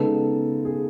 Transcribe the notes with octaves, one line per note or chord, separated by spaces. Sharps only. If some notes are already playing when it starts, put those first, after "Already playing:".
Already playing: C#3 G#3 B3 D#4 A4
G#4